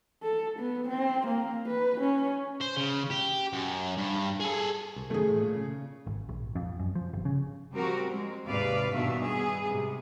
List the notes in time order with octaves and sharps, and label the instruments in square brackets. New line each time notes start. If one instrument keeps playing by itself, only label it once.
[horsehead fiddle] A4
B3
C4
A#3
B4
C#4
[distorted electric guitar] C5
C#3
G4
F#2
G2
G#4 A4
[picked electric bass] C2
[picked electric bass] F#2 D3 D#3 [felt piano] A3 G#4
[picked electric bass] A1 A2
A#2
C#3
G#1
A#1
F2
F#2
F3
G1
C#3
[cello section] F3 G3 C4 F#4 G4 A#4
G#3 C4
D#2 G#2 C3 B4 D5 F5
G2 B2 D#3 D4 F#4 E5
B3 G#4
G#2 C3